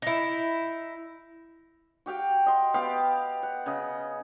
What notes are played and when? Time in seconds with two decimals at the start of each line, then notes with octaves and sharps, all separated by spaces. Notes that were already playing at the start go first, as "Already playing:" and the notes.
0.02 D#4 E4
2.06 F#4 G4 F5 G5
2.46 D#5 C6
2.74 B3 G4 F5 G5
3.43 F#5
3.66 C#3 D#5